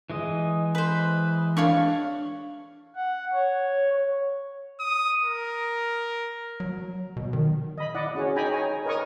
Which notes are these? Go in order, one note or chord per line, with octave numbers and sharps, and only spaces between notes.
E3 G#3 D#5
B4 C5
D4 C#5 F5 C#6
F#5
C#5
D#6
A#4
F#3
B2
D#3
D#5 B5
E4 D5 D#5 F#5
C#4 F#4 G#4 C#5
D#4 G#4 G5 G#5 A#5 B5
C#5 G#5 A#5
A#4 B4 D#5 G#5 C#6 D#6